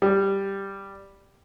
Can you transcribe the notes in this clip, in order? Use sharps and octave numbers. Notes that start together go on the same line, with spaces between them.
G3